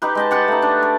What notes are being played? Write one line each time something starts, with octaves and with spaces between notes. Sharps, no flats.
D#4 G4 B4
G#3 D#5 A5
G4 F#5 A5 B5
A3 D#4
D4
D6